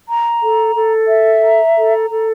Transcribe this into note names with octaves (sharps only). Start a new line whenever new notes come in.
A#5
A4
A4
E5
A#5
A4
A4